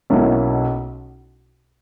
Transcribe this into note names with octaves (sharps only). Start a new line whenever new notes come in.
B1 B2 A#3 C#4 E4